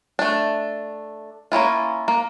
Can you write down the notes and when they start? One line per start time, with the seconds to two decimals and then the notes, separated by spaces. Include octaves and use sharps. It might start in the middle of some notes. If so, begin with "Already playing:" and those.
0.19 A3 D4
1.52 A#3 C#4 E4 F4
2.08 A#3